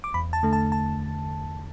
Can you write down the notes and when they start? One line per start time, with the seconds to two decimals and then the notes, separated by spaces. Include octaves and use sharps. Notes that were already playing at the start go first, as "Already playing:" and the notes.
0.04 D6
0.14 E2 B5
0.33 A5
0.43 D3 A3
0.53 A5
0.72 A5